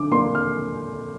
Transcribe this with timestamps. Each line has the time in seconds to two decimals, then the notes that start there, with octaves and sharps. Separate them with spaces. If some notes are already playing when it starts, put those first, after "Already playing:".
Already playing: D3 D6
0.12 A#3 D4 C6
0.35 F6